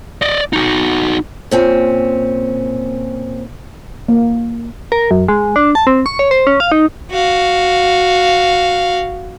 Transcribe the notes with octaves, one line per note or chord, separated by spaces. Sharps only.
D5 D#5
D#4 F#4
A#2 C4 C#4
A#3
A#4
F#2
G#3
D4
A5
C4
C#6
C#5
C5
C#4
F5
D#4
F#4 F5